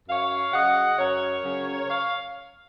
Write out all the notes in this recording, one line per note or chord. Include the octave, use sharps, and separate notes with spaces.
F#2 C#5 F5
C#3 F#3 D#5 F#5
F#2 A#4 C#5
C#3 F#3
C#5 F5